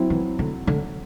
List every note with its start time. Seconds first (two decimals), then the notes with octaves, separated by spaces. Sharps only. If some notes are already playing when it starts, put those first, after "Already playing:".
Already playing: F#3 C4 E4
0.10 E3
0.39 D3
0.67 D3